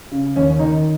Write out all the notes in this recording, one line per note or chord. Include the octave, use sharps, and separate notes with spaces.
C#3
D#2 C#4
D#3 D#4